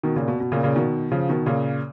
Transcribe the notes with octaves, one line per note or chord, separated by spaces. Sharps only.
B2 D#3
A#2 C#3
B2
B2
A#2 C#3
A#2 C#3
B2 D#3
C#3 F3
B2 D#3
A#2 C#3